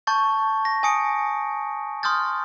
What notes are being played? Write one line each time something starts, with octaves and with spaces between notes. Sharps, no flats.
A5 C#6 G6 A6
A#6
G#5 D#6 C#7 D7
C6 D#6 F6 G6 A6